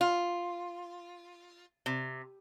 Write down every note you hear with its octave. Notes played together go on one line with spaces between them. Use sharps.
F4
C3